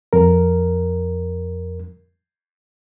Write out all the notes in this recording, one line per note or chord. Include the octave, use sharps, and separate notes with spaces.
F2 A#4